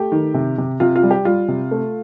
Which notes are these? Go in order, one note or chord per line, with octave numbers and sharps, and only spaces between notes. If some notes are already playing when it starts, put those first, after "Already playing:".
Already playing: A3 G4
D#3
C3
C3
C3 F4
F4
G3
G4
G3 F4
C3
A3